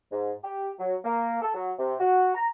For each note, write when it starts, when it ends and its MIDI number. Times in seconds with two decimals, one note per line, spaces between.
0.12 0.32 44
0.44 0.70 67
0.79 0.95 54
1.05 1.41 58
1.42 1.54 69
1.54 1.73 54
1.79 1.94 48
2.00 2.35 66
2.35 2.47 82